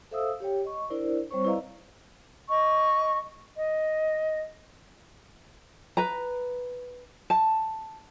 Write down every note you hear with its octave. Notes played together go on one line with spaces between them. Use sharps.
A4 C5 E5 F5 D#6 E6
G4 C#5 G5
D#5 C#6
D4 E4 A#4 C5 D5
G3 C4 C5 C#5 C#6
E4 B4 D5 D#5 F5 A#5
D#5 C#6
D#5
B4 A#5
A5